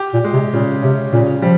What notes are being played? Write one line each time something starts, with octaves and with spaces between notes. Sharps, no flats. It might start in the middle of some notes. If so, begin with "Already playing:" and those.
Already playing: G4
A#2
G#3
C3
A#2 C#3
C3 C#4
A#2 C#3
F3 G3